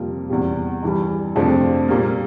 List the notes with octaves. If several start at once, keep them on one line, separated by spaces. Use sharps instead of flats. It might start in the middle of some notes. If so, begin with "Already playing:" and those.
Already playing: F2 C3 G3 A#3 F4
E2 C3 G3
G2 E3 G3
F2 C3 F3 A3 D4
A#2 G3 A#3